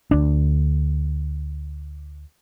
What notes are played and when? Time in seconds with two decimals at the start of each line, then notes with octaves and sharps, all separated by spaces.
0.11 D2 D4